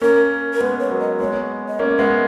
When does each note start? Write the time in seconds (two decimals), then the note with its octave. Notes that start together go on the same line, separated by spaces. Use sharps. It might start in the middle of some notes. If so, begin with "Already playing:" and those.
0.01 A#3 C#4 A#4
0.53 A#4
0.61 G#3 B3 B4
0.80 C#5
0.91 F#3 A#3
1.00 D#5
1.20 G#3 B3 C#5
1.68 D#5
1.79 A#3 C#4 C#5
1.98 G#3 B3 E5